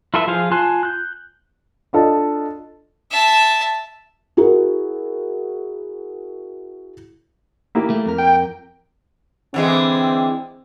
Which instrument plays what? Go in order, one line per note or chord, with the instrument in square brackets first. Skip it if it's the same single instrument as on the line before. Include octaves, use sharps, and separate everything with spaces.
[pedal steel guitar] E4 F4 A4 B4 E5
F3 F4 G#4 C5 F5
F4 G#5 A5 C6 F#6
F#6 G6
[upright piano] D4 F4 A4 D#5
[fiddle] E5 A5
[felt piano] E4 F#4 G#4 A#4
[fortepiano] A#3 E4 G4
[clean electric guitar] A3
F2 A#4
[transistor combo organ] G5
[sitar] D3 E3 G#3 [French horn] C4